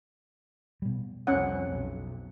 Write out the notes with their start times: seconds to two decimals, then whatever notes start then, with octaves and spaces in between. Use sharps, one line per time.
0.82 B2 G3
1.27 C2 F2 C#4 F#5
1.67 B1